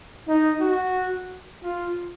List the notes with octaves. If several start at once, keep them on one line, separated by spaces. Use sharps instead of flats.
D#4
F#4
F4